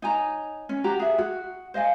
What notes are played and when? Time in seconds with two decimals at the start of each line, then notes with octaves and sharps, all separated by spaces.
0.02 D#4 C#5 G#5 A#5
0.69 C#4
0.84 F#4 G4 A#5
1.00 G#4 E5 G5
1.18 F#4
1.74 C5 D#5 F5 G#5